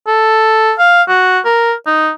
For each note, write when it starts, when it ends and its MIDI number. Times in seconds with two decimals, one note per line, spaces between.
0.07 0.72 69
0.79 1.03 77
1.08 1.39 66
1.45 1.74 70
1.86 2.11 63